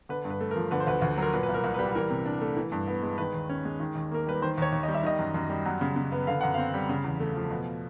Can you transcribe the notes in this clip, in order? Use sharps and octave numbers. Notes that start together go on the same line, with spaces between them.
D3 B4
G2
B4
A3
A#4
F3
D3 B4
C5
D2 B4
D2
F#3 A#4
A#2 B4
B4
C2
A#4
C2
B4
G3
E3 A#4
C3
D4
A3
E3
G2
B3
G#3
D#3 B4
D#2
C#4
G#3
D#3
D#2
A#3 A#4
G3 B4
D#3 C5
D#2 C#5
D#2
G3 D#5
E5
D#3 D#5
F#2
F#2
G3
F#3
C#3
C#3
B3
D3 F5
F#2 F#5
C4 F5
G3
C#3
E2
A3
F3
B2